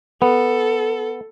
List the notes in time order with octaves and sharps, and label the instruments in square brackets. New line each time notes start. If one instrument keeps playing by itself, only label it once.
[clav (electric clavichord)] B3 [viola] A4